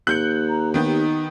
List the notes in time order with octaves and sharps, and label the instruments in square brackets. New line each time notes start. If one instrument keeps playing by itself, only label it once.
[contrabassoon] D#2 [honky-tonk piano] F#6 G6 C#7
[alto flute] A#5
[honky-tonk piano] D#3 B3 G4 [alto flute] D#4